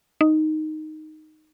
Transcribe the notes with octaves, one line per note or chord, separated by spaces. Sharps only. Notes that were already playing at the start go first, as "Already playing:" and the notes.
D#4